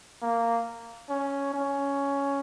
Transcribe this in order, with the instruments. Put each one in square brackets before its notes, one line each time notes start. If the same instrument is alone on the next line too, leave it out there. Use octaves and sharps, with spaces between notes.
[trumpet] A#3
C#4
C#4